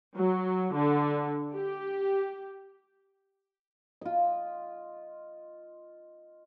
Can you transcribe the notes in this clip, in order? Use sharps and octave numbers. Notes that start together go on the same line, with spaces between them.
F#3
D3
G4
F4 D#5